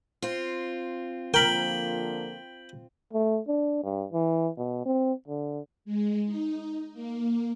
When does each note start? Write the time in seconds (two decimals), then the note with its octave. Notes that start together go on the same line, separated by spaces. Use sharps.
0.22 C4 F4
1.34 D3 F3 A#3 A#4 G5 B5
3.13 A3
3.48 D4
3.84 G2
4.12 E3
4.57 B2
4.86 C4
5.28 D3
5.85 G#3
6.26 D#4
6.93 A#3